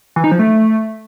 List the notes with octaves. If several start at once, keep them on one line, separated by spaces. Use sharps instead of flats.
E3
D#4
F3
A3